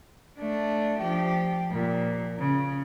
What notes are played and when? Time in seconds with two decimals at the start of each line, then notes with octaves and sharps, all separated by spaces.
0.39 A3 D4
0.99 F3 G4
1.71 A#2 F3
2.38 C#3